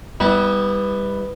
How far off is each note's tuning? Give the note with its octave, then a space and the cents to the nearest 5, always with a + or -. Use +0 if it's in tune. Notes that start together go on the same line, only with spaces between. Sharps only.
G3 +20 B3 +0 E4 -30